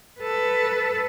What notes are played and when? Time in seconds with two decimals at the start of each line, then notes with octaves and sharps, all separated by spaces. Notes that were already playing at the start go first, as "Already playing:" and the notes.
0.20 A4 B4